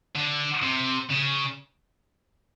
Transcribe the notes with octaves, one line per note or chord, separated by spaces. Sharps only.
D3
C3
C#3